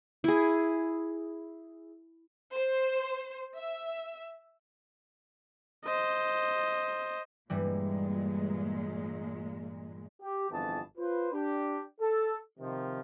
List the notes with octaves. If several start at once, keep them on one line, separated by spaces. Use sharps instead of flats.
E4 G#4
C5
E5
C5 D#5
G2 A#2 E3 G3 G#3
G4
G1 F2 E3 B3 G#4 A5
F4 B4 C5
D4 G4
A4
C3 D#3 F3